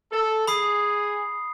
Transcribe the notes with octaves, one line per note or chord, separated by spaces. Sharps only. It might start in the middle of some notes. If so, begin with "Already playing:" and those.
A4
G#4 B5 D#6 C7